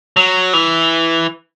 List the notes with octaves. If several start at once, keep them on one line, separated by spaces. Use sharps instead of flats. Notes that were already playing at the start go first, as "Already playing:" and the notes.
F#3
E3